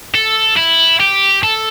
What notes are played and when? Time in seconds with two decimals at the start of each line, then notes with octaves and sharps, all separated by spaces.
0.15 A4
0.57 E4
1.00 G4
1.43 A4